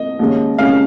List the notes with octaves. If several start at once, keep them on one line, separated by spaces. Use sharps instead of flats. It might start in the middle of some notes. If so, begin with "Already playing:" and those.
Already playing: D#5
D#2 C#3 G#3 C#4
C#3 G#3 C#4 F5